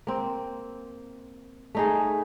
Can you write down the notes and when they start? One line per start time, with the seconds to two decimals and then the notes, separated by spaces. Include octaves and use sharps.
0.07 A#3 C4
1.75 A3 D#4 G#4